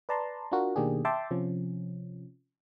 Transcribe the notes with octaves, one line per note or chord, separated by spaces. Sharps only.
B4 D5 A5 A#5 C6
D4 F4 F#4 A#4
B2 D#3 A#3 D4 G4 G#4
E5 G5 A5 C6 D6
C3 F3 C#4